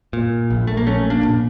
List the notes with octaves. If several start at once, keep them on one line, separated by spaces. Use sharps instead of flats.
A#2
A#1
A3
A#3
A#1 A3 C#4
A#3 D4
A#2